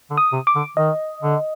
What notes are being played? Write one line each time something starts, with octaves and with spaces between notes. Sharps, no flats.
D3
D#6
C3
D6
D3
D#3 D#5
D3